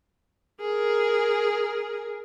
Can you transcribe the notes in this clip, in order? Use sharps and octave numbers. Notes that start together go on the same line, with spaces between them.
G#4 A#4